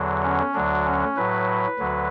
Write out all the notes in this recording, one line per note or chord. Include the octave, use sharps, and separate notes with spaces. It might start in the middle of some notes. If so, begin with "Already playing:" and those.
Already playing: E2 D3 F#3
C#4
D2 D3 F#3 D4
C#4
A2 F#3 B4
D2 D3 F#3